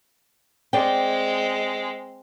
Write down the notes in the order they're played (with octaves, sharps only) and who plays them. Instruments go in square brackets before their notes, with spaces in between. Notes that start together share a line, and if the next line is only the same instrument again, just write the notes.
[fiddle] G#3 C4 [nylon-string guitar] D5 G5